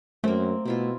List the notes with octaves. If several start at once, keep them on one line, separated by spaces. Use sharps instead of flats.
F#2 A3 A#3 C4
B2 C4 E4 F4